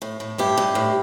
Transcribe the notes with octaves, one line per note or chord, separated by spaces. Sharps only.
A2
A2
G2 E4 G4
G2
A2